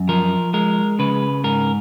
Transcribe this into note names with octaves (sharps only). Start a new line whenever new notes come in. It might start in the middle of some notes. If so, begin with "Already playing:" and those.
Already playing: F#2
F3 A#4
G#3 A#4
C#3 B4
G#2 A#4